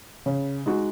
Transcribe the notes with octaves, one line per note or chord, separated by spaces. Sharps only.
C#3
G#3 D#4 F#4